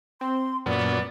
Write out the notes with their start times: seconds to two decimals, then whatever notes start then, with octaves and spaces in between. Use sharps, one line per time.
0.21 C4 C6
0.66 F#2 A#2 B3 D5